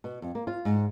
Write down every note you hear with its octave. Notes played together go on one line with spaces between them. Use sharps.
B2
F2
A#3
F4
G#2